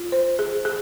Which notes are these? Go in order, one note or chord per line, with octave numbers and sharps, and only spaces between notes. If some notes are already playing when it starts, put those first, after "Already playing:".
Already playing: F4
C5
G#4
G#4